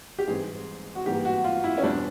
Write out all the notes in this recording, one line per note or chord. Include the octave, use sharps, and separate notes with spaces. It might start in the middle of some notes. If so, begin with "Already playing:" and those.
G4
G#2 E3 G3 C4 G#4
F#4
G#2 E3 G3 A#3 G4
F#4
F4
E4
C#4
E2 B2 G3 C4 D4